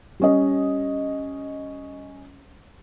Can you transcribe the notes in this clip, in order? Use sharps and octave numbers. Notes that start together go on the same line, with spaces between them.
G3 C#4 D#5